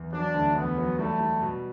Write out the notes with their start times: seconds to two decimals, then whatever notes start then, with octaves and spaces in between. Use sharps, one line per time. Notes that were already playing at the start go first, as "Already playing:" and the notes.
Already playing: E2
0.12 F#3 D4
0.34 D2
0.55 E2 B3
0.77 F#3
0.99 G3 A3
1.20 G3
1.42 B2